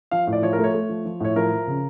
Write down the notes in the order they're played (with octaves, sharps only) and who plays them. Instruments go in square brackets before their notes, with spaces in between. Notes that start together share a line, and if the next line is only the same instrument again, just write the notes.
[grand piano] F3 F5
A2
D5
F3 C#5
A#4
A3 C#5
A3
F3
F3
A2 C#5
F3 A#4
F3
C#3